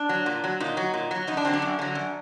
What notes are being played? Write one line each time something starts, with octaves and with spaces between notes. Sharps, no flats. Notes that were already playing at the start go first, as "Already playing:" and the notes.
Already playing: D4
F#3
A#2
F#3
A#2 D#4
F#3
A#2
F#3
F#2 D#4
D4
D3 F#3 C4
D4
F#2
D3 F#3
F#2